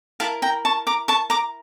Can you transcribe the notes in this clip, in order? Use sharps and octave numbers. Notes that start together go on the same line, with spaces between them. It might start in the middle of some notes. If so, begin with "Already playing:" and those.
E4 G4 A#4 F5 A5
G5 A#5
A5 C#6
A#5 D6
A5 C#6
A#5 D6